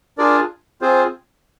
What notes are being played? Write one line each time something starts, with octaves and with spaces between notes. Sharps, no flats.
D4 F4 G#4 A#4 D5
C4 F4 G#4 C5